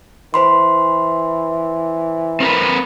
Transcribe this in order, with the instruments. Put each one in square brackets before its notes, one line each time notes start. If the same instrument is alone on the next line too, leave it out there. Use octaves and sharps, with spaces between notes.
[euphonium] E3 [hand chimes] C5 B5 C6
[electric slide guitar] C4 A#4 B4